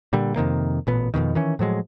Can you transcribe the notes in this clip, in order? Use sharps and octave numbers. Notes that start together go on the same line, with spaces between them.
A#2 D3 G3
F2 C3 D#3 A#3
A1 A#2 B3
F2 G#2 B2 D#3
D#3 E3 C#4
A2 F3 F#3 G#3